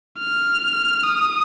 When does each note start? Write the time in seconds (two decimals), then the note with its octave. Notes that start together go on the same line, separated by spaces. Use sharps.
0.19 F6
1.04 D#6